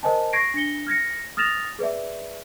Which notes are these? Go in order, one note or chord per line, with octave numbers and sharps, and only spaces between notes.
A#4 C5 D#5 G#5 A5
C#6 G#6 A#6 C7 D7
D4 A#6 C#7 G7
F6 G#6 A#6 C#7
D#6 F6 A6 A#6 E7 F7
G#4 B4 D5 E5